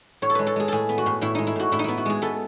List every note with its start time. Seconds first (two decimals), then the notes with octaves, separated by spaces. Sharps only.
0.22 A2 C#5
0.30 A4
0.35 G#3 B4
0.47 A4
0.56 G#3 G#4
0.68 A2 G#4 A4
0.89 B3
0.98 F#4
1.06 A2
1.21 A2 E4
1.35 G#3 D#4
1.47 E4
1.56 A2 F#4
1.72 A2 E4
1.79 D#4
1.84 B3 E4
1.98 F#4
2.05 G#3 G#4
2.22 B3 A4